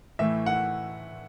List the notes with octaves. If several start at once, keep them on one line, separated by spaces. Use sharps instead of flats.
A2 E3 A3 E5
F#5